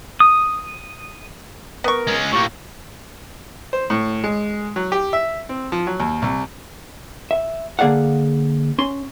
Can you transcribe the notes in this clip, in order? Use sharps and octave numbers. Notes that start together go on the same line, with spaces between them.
D#6
B3 A#4 C#6
G#3 C#4
A2 A#3 G4 C#6
C5
A2
G#3
F#3
G4
E5
C4
F3
F#3
D#2
C2
E5
D3 A#3 G#4 D5 F5 F#5
C#4 C6